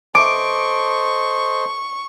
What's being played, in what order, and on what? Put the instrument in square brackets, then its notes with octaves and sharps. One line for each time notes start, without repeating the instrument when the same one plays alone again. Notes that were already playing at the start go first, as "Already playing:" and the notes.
[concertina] A4 C5 D#5 [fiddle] C#6 [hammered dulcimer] D6